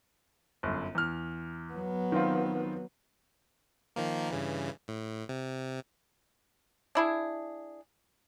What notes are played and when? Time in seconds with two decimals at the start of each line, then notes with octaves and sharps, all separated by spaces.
0.63 G1 F#2
0.95 E2 F6
1.73 F#3 B3
2.12 D#3 C4 F4
3.96 D#3 F3 A#3
4.31 G2 C#3 E3
4.88 A2
5.29 C3
6.95 D4 E4 G#4